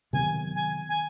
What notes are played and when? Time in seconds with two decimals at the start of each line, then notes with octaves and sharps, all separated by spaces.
0.13 C3 D#3 F#3 B3 G#5
0.55 G#5
0.89 G#5